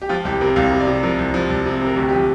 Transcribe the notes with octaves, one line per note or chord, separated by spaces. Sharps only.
G4
F3 F4
C2 G4
C3 A#4
C2 F5
C3
D5
C3
F3 A#4
C2
F3
C2
C3
C3
A#4
D2 G4
G4
F3